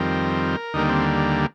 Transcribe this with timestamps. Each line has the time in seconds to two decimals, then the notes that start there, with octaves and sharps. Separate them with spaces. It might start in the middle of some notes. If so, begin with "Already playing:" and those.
Already playing: F2 D#3 G3 C4 A#4
0.74 D#2 D3 G3 A#3 D#4
0.89 C4